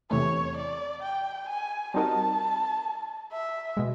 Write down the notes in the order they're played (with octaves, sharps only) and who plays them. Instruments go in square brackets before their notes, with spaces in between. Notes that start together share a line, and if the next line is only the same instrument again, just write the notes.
[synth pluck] E2 C3 E3 A3 [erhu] C#5
[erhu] D5
G5
G#5
[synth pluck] G3 C4 D#4 F#4 A#4 [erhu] A5
[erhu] E5
[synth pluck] B2 G#3